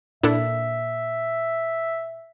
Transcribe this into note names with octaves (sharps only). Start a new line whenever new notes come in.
A#2 D4 E4 A4 E5